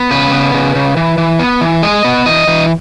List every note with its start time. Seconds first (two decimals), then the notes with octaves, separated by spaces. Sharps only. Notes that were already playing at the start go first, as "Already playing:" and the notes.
Already playing: B3
0.11 C#3 B4
0.32 B3
0.54 C#3
0.75 C#3
0.97 E3
1.18 E3
1.40 B3
1.61 E3
1.83 G#3 D#5
2.04 B3
2.26 E3 D#5
2.47 E3